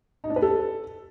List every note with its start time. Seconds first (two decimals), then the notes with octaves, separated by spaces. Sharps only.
0.24 D#4
0.30 D4
0.36 B4
0.42 A4